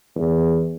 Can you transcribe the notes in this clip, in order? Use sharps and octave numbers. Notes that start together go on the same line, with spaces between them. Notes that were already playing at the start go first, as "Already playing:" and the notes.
E2